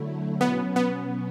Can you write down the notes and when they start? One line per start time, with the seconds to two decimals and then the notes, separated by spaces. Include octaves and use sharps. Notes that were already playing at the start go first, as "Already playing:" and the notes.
Already playing: D3 F#3 A3 E4
0.41 B2 F#3 B3 C#4
0.76 B3